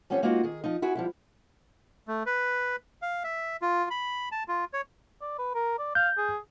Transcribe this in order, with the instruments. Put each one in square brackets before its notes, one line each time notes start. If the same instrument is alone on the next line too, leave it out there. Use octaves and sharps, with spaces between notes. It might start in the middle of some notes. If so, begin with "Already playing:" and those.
[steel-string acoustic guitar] F3 G3 B3 C#4 C#5
G#3 A#3 B3 D#4 F4 F#4
D#3 G#4
F3 D#4
E4 F#4 G#4
F3 G3 E4
[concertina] A3
B4
F5
E5
F4
B5
A5
F4
C#5
[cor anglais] D5
B4
A#4
D5
[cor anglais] F5 [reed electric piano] G6
[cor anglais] G#4